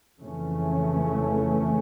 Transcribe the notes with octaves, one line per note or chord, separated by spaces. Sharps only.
F2 C#3 E3 A3 C#4